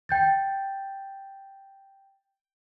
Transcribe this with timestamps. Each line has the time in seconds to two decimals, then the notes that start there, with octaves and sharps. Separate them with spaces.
0.09 G5 G6 A6